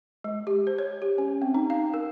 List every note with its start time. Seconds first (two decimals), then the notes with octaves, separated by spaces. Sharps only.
0.24 G#3
0.47 G4
0.67 C5
0.78 C#5
1.02 G4
1.18 C#4
1.42 C4
1.55 D#4
1.70 F5
1.94 A#4